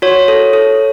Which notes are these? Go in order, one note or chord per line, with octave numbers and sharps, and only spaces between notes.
F#4 C#5
A4
A4